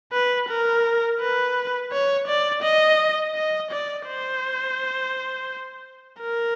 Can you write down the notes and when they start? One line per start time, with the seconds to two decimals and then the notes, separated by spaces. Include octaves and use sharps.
0.13 B4
0.49 A#4
1.20 B4
1.92 C#5
2.27 D5
2.63 D#5
3.35 D#5
3.71 D5
4.07 C5
6.20 A#4